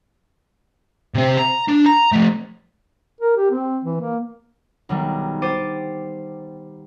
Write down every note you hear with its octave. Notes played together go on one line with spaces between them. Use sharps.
C3 C4
A#5
D4
A#5
F3 A3
A#4
G4
C4
E3
A#3
B1 D#3 G3
G4 C5 D6 A6 D#7